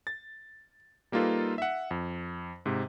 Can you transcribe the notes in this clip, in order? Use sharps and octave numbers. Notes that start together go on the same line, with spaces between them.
A6
G3 A#3 D#4 F4 A4 B4
E5 F#5
F2
G#2 C3